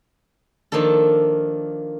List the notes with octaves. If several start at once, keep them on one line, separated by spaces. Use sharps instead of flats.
D#3 F3 A#3 D4 A4